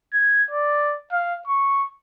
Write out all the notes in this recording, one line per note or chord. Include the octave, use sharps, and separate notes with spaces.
G#6
D5
F5
C#6